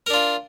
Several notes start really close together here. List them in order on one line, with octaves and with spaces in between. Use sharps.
A#4 D4 F4